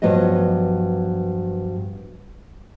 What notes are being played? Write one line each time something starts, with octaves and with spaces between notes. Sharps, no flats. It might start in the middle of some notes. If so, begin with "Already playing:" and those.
G2 F3 F#3 B3 D#5